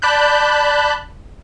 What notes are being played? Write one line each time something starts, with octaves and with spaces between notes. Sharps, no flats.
D5 A5 B5 F#6 G6